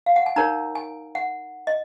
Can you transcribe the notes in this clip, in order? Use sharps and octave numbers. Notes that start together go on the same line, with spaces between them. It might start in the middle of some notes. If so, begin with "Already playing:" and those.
F5
F#5
G#5
D#4 A#4 C#5 A#5
G#5
F#5
D#5